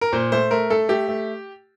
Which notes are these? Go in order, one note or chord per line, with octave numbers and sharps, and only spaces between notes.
A#4
A#2 C5
A3 C5
A3 A#4
A3 A4
A3 G4
A3